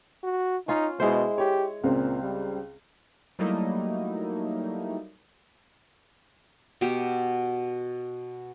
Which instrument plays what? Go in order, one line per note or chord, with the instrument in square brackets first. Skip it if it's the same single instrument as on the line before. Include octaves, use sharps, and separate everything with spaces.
[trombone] F#4
[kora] C#4 F4 [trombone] D#4
[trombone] B2 [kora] G#3 E4 C5
[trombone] G4 [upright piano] C#5
[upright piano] C#2 C4 [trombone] A#2
[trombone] G3
[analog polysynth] F#3 G3 A3 A#3 D#4 E4
[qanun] B2 G4